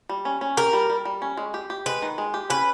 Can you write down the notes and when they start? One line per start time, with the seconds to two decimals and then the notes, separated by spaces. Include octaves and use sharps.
0.09 G3
0.25 C#4
0.41 C#4
0.57 G4 A#4
0.73 G3
0.90 G3
1.05 G3
1.22 C#4
1.37 G#3
1.54 G4
1.70 G4
1.86 G#3 B4
2.02 D#3
2.18 G#3
2.34 G4
2.50 C#4 B4